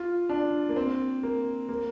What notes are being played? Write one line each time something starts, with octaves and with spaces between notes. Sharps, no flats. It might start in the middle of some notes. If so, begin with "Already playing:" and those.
Already playing: F4
D4
A#3
C4
A#3
A#3